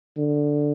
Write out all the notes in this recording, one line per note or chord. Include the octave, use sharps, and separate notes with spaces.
D3